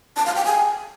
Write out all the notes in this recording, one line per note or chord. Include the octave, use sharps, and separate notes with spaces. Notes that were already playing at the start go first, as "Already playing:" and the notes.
A5
F5
G5
G#5